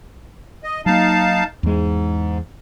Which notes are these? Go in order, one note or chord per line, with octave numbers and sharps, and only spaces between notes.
D#5
F#3 A#3 D#4 F5 A5
E2 G#2 G#3